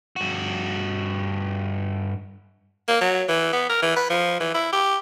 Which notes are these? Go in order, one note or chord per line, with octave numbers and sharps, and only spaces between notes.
G2 F#4
A#3
F#3
E3
B3
A#4
E3
B4
F3
E3
E4
G4